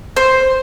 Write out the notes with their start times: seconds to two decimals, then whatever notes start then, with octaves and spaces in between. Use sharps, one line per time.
0.16 C5